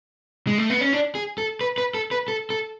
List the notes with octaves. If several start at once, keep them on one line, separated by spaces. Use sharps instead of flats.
G#3
A3
B3
C#4
D4
G#4
A4
B4
B4
A4
B4
A4
A4